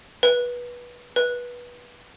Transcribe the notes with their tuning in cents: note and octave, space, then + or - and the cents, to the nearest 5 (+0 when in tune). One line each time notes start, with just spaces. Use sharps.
B4 -20
B4 -20